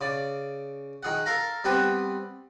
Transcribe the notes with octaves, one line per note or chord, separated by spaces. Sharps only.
C#3 D5
D#3 G#4 F#5
A4 A#4 F5 A#5
G3 B3 C4 B4 G5